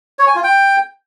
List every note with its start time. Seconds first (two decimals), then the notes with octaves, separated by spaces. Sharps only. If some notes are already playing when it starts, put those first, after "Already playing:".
0.19 C#5
0.27 G#5
0.35 F4
0.44 G5